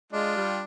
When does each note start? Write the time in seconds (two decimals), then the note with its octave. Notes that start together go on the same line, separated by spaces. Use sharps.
0.12 G#3 D4 F4
0.37 G3